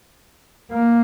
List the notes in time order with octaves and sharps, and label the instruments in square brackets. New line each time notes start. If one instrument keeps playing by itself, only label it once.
[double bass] A#3